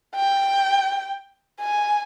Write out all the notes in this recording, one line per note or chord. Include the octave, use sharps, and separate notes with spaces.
G5
G#5